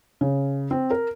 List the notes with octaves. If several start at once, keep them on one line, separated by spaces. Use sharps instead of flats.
C#3
C4
A#4